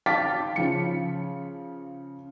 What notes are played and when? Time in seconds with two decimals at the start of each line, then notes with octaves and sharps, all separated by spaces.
0.06 F5 G5 A5 D6 A6 B6
0.56 C#3 F3 C#7